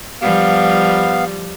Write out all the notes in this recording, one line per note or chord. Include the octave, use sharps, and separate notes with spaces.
F3 G3 B3 F5